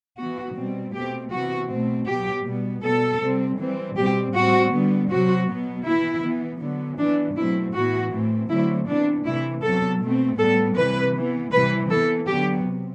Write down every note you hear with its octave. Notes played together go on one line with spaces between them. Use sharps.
E3 B3 F#4
B2 G3 C4
B2 A3 C4 G4
C3 E3 B3 F#4
B2 A3 C4
B2 F#3 B3 G4
B2 G3 B3
B2 G3 B3 A4
C3 G3 C4
E3 G3 C4
B2 G3 C4 G4
A2 G3 C4 F#4
D3 G3 B3
C3 F#3 C4 F#4
B2 F#3 B3
E3 B3 E4
E3 B3
D3 F#3 B3
E3 B3 D4
B2 F#3 A3 C4 E4
A2 E3 B3 F#4
A2 E3 A3 C4
D3 F#3 A3 C4 E4
C3 E3 B3 D4
C3 E3 A3 E4
C3 F#3 B3 A4
B2 A3 C4
A2 G3 B3 A4
C3 E3 G3 B4
E3 B3
C3 E3 G3 B4
E3 B3 A4
D3 F#3 B3 G4
C3